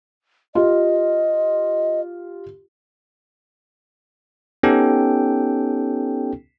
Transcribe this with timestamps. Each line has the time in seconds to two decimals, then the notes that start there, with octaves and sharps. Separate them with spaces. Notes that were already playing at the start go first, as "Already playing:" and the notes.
0.55 F4 G4 D#5
4.63 B3 C#4 D#4 G4 A4 G5